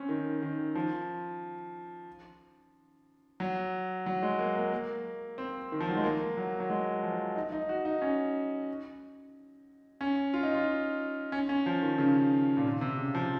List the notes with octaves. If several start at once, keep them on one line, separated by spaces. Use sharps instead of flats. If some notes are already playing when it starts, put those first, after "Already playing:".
Already playing: C4 C#4
D#3
D#3
F3
F#3
F#3
G#3
A#3
A#3
A#3
C4
D#3
F3
F#3
G#3
A#3
F#3
F#3
G#3
F3
D#4
D#4
F#4
D#4
C#4
C#4
F4
D#4
F4
C#4
C#4
F3
D#3
C#3
A#2
C3
C3
C#3
F3